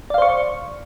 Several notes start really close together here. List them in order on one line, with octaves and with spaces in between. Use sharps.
D5 F5 C5 C#6